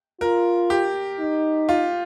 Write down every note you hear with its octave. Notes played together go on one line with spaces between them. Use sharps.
F4 A#4
G4
D#4
F4